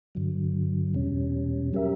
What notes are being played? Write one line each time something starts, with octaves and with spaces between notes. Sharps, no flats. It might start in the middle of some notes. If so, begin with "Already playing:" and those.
G2 D3 F#3
E2 B2 G3 C#4
F#3 C#4 G4 A#4 E5